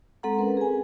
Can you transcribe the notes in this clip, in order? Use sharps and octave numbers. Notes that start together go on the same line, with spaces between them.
G#3 C4 A4 F#5 A#5
C#4 A#4 B4
G#4 G#5